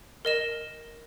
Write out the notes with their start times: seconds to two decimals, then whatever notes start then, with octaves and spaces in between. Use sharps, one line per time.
0.25 A#4 D#5 E7